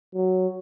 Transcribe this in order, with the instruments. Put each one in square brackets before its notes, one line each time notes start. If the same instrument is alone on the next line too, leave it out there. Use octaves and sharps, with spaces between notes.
[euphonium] F#3